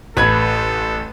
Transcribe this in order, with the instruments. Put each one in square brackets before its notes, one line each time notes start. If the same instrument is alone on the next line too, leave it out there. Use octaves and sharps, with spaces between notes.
[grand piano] A1 G#6 [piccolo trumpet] A4 [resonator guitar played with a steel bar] B4